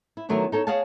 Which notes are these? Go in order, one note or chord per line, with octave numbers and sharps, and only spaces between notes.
E4
D#3 E3 F#3 A3 B3 D4
D#4 A4 C#5
G#4 C#5 D#5 F5 F#5 A5